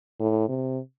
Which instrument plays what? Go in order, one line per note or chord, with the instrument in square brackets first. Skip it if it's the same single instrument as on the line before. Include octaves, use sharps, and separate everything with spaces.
[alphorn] A2
C3